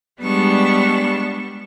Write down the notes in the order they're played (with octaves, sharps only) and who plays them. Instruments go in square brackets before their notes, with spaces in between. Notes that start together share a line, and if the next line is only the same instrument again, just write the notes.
[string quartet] G3 G#3 B3 D4 C#6